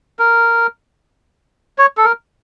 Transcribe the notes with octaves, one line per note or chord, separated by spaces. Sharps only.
A#4
C#5
A4
A#4